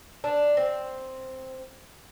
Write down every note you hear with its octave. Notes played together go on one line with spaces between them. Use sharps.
D4
C4